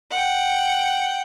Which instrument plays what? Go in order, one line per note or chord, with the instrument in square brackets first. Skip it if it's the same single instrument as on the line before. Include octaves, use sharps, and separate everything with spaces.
[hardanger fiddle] F#5 G5